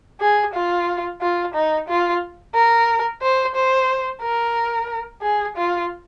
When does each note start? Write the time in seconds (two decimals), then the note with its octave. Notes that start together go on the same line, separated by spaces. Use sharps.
0.20 G#4
0.54 F4
1.21 F4
1.54 D#4
1.89 F4
2.54 A#4
3.22 C5
3.55 C5
4.21 A#4
5.22 G#4
5.56 F4